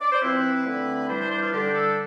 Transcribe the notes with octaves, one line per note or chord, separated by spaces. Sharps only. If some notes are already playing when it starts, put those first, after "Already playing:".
D5
C5
F3 C4 E4 B4
D3 A3 C4 E4
E3 G3 D4 C5
C5
C5
F4
D3 G3 D4 G4
A4